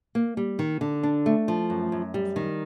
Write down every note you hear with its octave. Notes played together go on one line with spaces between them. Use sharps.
A#3
G3
D#3
D3
D4
A3
F3
F#2
F#2
G3
D#3